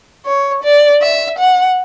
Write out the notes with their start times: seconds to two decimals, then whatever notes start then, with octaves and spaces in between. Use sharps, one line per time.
0.25 C#5
0.63 D5
1.01 E5
1.38 F#5